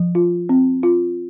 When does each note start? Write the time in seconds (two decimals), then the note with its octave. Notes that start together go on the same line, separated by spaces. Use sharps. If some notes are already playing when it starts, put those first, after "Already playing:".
Already playing: F3
0.15 F4
0.49 C4
0.83 F4